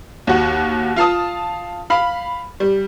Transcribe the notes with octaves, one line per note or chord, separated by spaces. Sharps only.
D#2 F#4
F4 F5 A5 D#6
F5 B5
G3